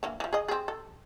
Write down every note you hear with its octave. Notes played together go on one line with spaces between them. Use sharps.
D3 E3 A#3
E3 F3
G#4 D#5
C4 G#4
A4